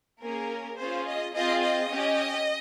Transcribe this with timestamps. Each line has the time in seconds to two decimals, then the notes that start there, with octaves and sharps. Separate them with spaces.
0.21 A#3 C#4 G#4 A#4
0.78 C#4 F4 G#4 C5
1.07 D#5
1.34 C4 F4 G#4 D#5
1.63 D#5
1.91 C#4 G4